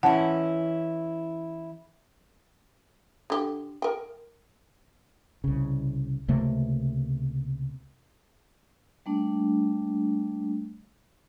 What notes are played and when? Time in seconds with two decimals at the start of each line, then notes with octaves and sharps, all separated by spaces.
0.03 E3 C#4 E4 F#5 A5
3.30 D3 G4
3.82 A#4 G5
5.44 C2 C#3
6.28 C#2 C3 A3 A#3
9.06 G3 A3 A#3 D4